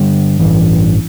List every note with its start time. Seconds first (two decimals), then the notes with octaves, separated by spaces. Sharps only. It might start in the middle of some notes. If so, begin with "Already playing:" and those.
Already playing: G2 D3 G3
0.39 A1 G2 E3